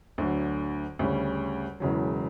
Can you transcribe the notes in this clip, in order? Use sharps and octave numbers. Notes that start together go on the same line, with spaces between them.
D2 D3 F#3
D2 C#3 G3 C#4
E1 E2 C#3 F#3